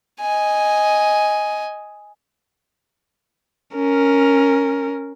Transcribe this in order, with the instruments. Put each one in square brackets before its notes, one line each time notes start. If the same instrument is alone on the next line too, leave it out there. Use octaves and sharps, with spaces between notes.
[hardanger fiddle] D#5 G#5
[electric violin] C#4 A#4